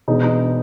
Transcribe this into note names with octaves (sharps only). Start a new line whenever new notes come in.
E1 D#4
D#4